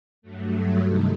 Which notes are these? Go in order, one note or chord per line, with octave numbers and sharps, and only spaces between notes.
G2 F#3 A3
G2 C3 D#3 A3 D#4